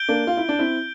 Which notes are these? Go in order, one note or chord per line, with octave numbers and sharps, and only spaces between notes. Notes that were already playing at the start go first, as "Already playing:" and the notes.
Already playing: G6 D7 G7
A#3 D4
F4
E4
D4
C4 E4